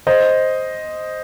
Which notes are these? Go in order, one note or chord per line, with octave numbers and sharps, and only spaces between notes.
C5 D#5